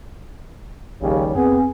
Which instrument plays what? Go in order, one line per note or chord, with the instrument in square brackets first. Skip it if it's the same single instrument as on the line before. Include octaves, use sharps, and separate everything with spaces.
[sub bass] A#1 [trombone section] D#2 C#3 G3
[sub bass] F2 [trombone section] B3 G#4 [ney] C4